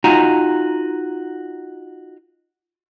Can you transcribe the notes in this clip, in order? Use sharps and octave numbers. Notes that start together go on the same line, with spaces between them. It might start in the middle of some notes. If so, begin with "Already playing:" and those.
D#4 F4 F#4 G#5 A#5